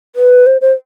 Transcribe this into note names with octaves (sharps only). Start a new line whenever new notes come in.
B4
C5
C5